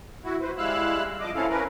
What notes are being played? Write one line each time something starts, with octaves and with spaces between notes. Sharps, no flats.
E4 F#4
B4 C5
G3 G#3 E4 F5 E6 F#6
F3 D#5 D6
C4 C#4 E4 A4 F5
C#4 A#4 B4